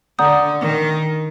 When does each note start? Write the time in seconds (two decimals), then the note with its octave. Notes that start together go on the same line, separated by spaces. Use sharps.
0.19 D3 D5 F#5 A#5 D#6 G6
0.61 D#3